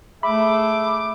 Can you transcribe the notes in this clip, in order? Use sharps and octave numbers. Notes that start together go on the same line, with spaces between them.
A3 G#4 E5 B5 D6